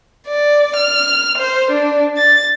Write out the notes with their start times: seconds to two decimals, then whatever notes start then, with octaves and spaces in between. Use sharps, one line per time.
0.28 D5
0.76 F6
1.38 C5
1.71 D4
2.17 A6